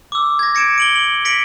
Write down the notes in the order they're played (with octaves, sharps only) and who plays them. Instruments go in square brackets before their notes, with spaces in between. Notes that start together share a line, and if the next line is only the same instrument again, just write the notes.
[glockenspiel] D6 E6
G#6 A#6
A#6 C#7 D7 E7
D7 F#7 G7
F#7
A#6 B6 C#7 D7 F#7